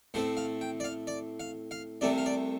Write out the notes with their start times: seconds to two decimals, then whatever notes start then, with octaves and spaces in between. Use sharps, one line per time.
0.14 A2 A3 C4 C5
0.37 F5
0.61 G5
0.80 D5
0.84 F5
1.07 D5
1.40 F5
1.71 F5
2.01 C2 C3 A3 C4 D5
2.18 F5
2.26 D5